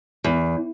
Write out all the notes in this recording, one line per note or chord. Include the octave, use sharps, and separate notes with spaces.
E2